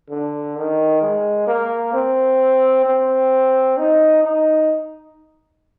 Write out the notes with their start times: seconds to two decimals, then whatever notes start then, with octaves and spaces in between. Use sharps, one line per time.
0.10 D3
0.56 D#3
1.01 G#3
1.47 A#3
1.94 C4
2.86 C4
3.77 D#4
4.23 D#4